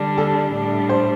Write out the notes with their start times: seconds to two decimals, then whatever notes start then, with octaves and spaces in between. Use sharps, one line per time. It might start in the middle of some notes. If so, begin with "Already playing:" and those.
Already playing: D3 G3 D4
0.18 A4
0.53 A2 G3 D4
0.89 C5